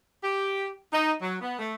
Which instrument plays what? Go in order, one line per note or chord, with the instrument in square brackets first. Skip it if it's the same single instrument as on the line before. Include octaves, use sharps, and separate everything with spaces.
[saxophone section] G4
D#4
F#3
B3
A3